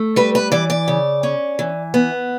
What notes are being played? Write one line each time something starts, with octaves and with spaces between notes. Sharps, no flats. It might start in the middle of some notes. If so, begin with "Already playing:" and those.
Already playing: A3
G3 B4
B4
E3 D5
D5
C#3
C#4
E3
B3